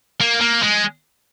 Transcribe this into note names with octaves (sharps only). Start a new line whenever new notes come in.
A#3
A#3
G#3